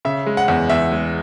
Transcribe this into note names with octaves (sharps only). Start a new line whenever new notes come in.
C#3 E5
G#3
F#5
E2
E2 E5
G#3